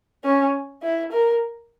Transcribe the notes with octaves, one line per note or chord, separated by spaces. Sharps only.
C#4
E4
A#4